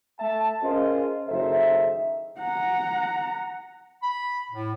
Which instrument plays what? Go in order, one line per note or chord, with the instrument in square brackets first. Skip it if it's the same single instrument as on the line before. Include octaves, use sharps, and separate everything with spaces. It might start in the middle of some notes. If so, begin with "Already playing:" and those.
[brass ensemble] A3 E5 A5
C#4 F4 G#4 A#4 C5 D#5
F#1 D#3 A4 C5 E5
[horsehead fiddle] F#5 A#5
[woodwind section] B5
A2